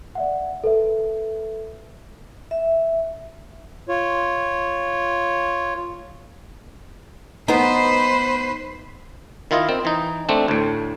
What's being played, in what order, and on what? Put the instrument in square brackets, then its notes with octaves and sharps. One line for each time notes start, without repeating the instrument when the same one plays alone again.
[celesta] D5 E5 F#5
A4 B4 E5
[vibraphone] E5
[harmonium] F4 C#5
[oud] B3 D#4 [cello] B4 C5
[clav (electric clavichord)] D#3 E4 F4 D#5
C4
E3 D#4
A3 C4 D4
D2 A2